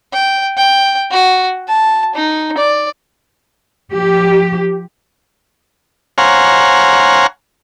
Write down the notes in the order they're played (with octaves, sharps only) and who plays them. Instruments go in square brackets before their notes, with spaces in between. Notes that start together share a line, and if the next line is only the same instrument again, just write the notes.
[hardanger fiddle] G5
G5
F#4
A5
D#4
D5
[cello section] F3 G4
[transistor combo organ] C5 C#5 F5 F#5 G#5 A#5